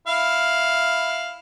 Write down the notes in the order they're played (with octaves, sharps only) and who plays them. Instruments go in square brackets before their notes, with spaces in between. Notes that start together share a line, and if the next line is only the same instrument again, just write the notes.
[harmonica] E4 F5